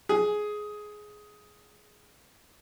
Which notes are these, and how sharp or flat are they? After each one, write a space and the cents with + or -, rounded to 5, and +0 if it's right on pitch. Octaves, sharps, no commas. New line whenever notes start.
G#4 +10